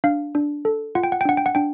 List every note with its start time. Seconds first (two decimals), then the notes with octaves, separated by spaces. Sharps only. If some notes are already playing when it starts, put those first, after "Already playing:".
0.04 D4 F5
0.35 D4
0.65 A4
0.95 F4 F#5
1.03 G5
1.12 F#5
1.21 G5
1.25 D4 F#5
1.37 G5
1.46 F#5
1.55 D4 G5